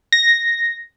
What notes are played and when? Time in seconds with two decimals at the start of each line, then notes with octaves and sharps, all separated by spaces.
0.12 A#6